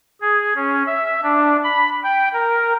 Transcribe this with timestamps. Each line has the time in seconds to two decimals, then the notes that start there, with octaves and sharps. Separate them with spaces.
0.21 G#4
0.56 C#4
0.87 E5
1.23 D4
1.64 B5
2.03 G5
2.33 A#4